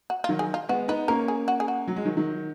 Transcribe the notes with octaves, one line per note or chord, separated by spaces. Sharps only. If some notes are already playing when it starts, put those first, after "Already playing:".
F#4
F4
D#3 F#3
G#4
F4
G#3 B3 F#4
B3 D#4 B4
A#3 C#4 A#4
G#4
F#4
G#4
F#4
F#3
G#3
D#3 F#3
D#3 F#3